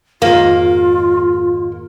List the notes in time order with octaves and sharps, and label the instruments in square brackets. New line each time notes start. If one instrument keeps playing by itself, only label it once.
[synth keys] F2 G#2 D#3 [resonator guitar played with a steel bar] A#3 [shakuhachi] F4